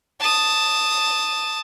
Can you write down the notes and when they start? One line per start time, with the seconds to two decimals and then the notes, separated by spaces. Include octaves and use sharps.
0.20 A5 D#6